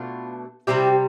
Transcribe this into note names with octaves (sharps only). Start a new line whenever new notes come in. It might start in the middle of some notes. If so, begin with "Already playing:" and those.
Already playing: B2 A3 D4 F4
C3 G3 C4 E4 G4